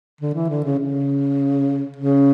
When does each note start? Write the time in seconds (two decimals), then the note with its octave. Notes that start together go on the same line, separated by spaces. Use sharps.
0.21 D3
0.35 E3
0.49 D3
0.64 C#3
0.79 C#3
1.97 C#3